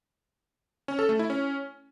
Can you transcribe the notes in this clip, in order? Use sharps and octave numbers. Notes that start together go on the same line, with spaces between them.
C#4
A4
A3
E4
C#4